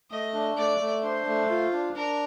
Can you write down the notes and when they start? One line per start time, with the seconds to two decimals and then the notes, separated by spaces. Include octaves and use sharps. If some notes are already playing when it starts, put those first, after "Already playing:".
0.11 A3 D#5
0.34 D4
0.57 A3 D5
0.81 A3
1.03 D4 C5
1.27 A3
1.49 F4
1.73 D4
1.96 D4 A#4